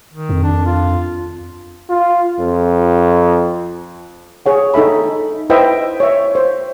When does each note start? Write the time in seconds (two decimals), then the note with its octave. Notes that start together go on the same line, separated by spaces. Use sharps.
0.13 D#3
0.29 F2
0.43 D4
0.65 F4
1.89 F4
2.39 F2
4.46 G#4 C#5 F#5
4.74 D#4 A4 E5 B5
5.50 E4 B4 C5 D#5 E5 G5
6.00 C#5 E5
6.35 C5